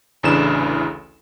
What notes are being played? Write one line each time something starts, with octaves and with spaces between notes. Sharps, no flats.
A1 D2 C#3 E3 D4 E7